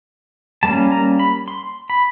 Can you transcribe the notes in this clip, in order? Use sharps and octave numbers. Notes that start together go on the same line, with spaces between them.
G3 A#3 C#4 A5
A#5
B5
C6
B5